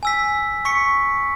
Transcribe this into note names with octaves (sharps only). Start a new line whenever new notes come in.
G#5 E6 B6
C#6 B6 C#7